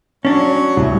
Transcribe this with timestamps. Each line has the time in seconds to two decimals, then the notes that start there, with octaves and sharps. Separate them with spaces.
0.25 F#3 C#4 D4 C#5
0.77 C2 A2 C3 E4